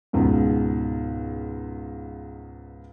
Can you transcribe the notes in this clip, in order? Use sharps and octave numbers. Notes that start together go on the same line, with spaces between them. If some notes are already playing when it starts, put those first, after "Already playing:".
C#2 G#2 B2